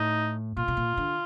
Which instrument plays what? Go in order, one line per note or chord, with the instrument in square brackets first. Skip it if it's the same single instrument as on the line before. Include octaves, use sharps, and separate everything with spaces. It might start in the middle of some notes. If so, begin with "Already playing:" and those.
Already playing: [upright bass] A2 [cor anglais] D#4
[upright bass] A#2 [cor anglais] F4
[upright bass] B2
A#2
D3